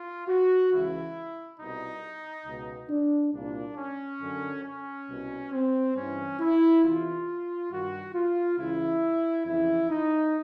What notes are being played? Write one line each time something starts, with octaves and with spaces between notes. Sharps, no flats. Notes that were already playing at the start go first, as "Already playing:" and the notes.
Already playing: F4
F#4
C#2 C#3 E3 E4
C2 B2 D#4
C#2 B2
D4
C2 A#2 D4
C#4
F#2 D3
C#4
C2 B2
C4
G2 E3 C#4
E4
E2 C3 E3 F4
G2 D#3 F#4
F4
C#2 C#3 E3 E4
F2 C#3 E3 E4
D#4